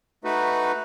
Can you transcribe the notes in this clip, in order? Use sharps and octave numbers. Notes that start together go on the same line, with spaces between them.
A3 D#4 F#4 B4